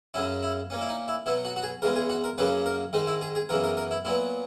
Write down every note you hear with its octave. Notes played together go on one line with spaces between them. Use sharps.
F#2 C#3 F#3 C#4 E4
E4
A#2 A#3 C#4
E4
D#4
E4
B2 F#3 B3 E4
F#4
F#4
G#4
E2 C#3 G#3 B3 A#4
G#4
F#4
A#4
F#2 C#3 F#3 A#3 C#4 B4
A#4
G#2 D#3 G#3 D#4
E4
G#4
G#4
F#2 C#3 E3 B3 A#4
A#4
A#4
E4
A#2 F#3 B3 E4